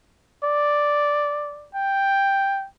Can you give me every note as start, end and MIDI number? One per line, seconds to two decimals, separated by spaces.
0.44 1.69 74
1.75 2.67 79